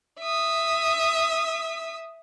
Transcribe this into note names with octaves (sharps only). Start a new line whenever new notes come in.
E5 D#6